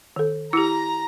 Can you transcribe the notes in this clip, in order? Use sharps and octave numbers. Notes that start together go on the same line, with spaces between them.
D#3 A4
E4 G4 A#5 E6